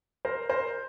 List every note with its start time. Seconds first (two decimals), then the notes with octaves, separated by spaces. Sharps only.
0.25 A#4 C5
0.50 A#4 C5